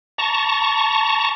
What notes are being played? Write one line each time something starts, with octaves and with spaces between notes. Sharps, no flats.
A5 A#5 C#6